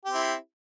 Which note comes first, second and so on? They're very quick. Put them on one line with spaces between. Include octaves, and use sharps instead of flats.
G4 C4 E4